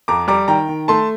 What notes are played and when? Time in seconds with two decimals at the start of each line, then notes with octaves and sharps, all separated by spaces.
0.08 F2 A#5 D6
0.28 G3 A#5 D6
0.48 D#3 G5 A#5
0.69 D#3
0.88 A3 A5 C6